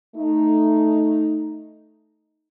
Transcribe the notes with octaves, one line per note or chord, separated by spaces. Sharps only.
A3 D#4